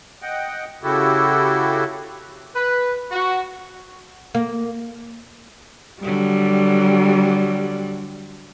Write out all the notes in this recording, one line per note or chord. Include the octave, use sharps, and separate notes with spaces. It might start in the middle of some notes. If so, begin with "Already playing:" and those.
D#5 F#5 G5
C#3 E4 F#4 G4 A4
B4
F#4
A#3
D3 F#3 G3